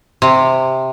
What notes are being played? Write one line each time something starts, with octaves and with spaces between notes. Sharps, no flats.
C3